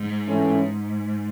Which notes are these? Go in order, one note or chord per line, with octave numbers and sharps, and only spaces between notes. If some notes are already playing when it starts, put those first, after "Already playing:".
Already playing: G#2
E3 A3 C#4